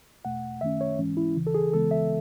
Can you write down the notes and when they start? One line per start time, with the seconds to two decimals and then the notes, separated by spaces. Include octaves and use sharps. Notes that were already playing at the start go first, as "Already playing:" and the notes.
0.25 E2 B2 A3 F#5
0.61 F#2 D#3 A3 C#4 E5
0.81 C#5
0.98 G#2 E3 G#3 C#4
1.17 E4
1.36 D#2 C#3 E3
1.47 A4
1.55 G#4
1.73 C#2 C#3 E3 G#3 B3 A4
1.91 E5